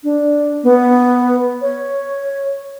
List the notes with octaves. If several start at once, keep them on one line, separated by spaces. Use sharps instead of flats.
D4
B3
C#5